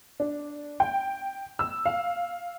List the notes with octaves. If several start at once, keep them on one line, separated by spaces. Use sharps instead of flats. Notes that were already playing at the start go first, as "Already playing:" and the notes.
D4
G5
E6
F5